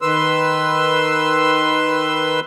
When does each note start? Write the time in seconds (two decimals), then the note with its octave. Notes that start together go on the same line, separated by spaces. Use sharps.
0.02 D#3 B4 C6 E6